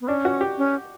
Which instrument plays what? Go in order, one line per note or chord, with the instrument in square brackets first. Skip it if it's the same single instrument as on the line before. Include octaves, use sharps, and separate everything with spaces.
[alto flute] B3
[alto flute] C#4 [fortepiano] D4
[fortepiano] F#4
G4
[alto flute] C#4